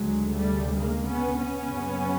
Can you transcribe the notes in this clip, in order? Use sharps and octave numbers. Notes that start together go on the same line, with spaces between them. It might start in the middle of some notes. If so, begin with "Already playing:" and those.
Already playing: D2 C#3 F#3 G#3
G3 A3
G#3 A#3
B3 C#4
B3 C#4
F#2 C#3